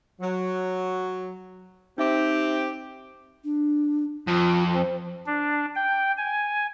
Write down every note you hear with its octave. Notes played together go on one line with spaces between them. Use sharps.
F#3
C4 D#4 G4 E5
D4
F2 F4
C5
D4
G5
G#5